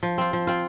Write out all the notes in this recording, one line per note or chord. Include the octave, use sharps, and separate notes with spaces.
F3
C4 F4
F3
C4 F4